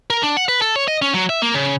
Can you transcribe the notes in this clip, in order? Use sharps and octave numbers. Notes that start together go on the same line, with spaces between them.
A#4
D4
F#5
B4
A4
C#5
D#5
C#4
F#3
E5
A#3
C#3